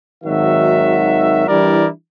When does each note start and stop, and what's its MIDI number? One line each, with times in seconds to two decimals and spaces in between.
0.24 1.44 32
0.24 1.44 51
0.24 1.44 54
0.24 1.44 66
0.24 1.44 76
1.47 1.88 52
1.47 1.88 55
1.47 1.88 62
1.47 1.88 64
1.47 1.88 70
1.47 1.88 74